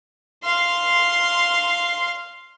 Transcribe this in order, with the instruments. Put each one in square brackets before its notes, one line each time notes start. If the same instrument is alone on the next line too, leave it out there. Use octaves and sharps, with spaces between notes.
[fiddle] F5 C6